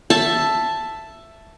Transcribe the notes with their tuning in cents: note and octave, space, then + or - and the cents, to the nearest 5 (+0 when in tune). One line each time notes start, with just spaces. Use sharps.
E5 +10 A5 +0